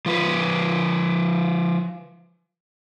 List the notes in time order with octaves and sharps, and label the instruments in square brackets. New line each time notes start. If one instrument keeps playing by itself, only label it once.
[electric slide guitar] F3 F4 B4